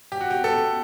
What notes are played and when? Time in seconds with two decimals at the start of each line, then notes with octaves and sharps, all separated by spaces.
0.12 G4
0.21 F#4
0.30 G4
0.44 A4